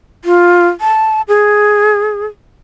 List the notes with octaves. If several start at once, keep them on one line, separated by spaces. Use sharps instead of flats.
F4
A5
G#4